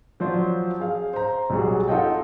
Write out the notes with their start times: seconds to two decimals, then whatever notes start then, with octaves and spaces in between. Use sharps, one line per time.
0.20 F3 F#3 F4 C5 D5
0.80 G#4 F5
1.13 C5 A#5
1.50 B1 F#3 G3 F#4 G#4
1.88 D#4 F4 A4 D#5 F#5 G5